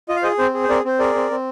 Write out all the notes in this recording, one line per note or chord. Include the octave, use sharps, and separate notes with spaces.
F4 D#5
F5
G#4 C5 D#5
C4 C5
G#4
C5
C4 A#4 D5
C4 C5
G#4 A#4 D5
C4
C4